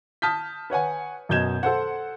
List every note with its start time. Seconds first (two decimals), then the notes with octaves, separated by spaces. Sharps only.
0.22 A5 D#6 F6 G6 B6
0.70 B4 C#5 F#5 G#5
1.29 F#2 B2 D#5 G6 G#6 E7
1.63 A4 C5 F#5